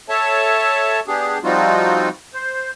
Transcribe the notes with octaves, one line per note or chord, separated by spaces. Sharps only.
A4 C#5 E5 A5
B3 D4 G4 G#4
F3 G3 C4 D#4 F4 F#4
C5